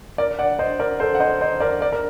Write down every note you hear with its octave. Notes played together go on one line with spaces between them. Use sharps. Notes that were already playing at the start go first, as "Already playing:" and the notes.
A#4 D5
D5 F#5
C5 D#5
A#4 D5
A4 C5
F#5
C5 D#5
C5 D#5
A#4 D5
A#4 D5
A#4